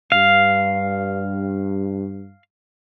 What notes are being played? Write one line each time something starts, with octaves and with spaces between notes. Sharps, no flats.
G2 F5